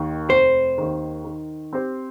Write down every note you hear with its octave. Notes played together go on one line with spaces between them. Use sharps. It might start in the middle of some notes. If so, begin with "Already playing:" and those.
Already playing: D#2 D#3
F1 C5
D#2 D#3
D#3
C4 G4 C5